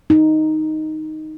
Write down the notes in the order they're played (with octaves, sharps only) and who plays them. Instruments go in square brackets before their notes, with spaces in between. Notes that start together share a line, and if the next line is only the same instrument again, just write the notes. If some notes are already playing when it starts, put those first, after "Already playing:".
[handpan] D#4